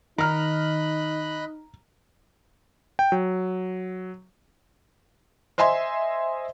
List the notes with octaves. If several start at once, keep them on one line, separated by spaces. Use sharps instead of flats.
D#3 D#4 D#5 A#5 B5 F6 F#6
G5
F#3
C5 D#5 E5 G#5 C6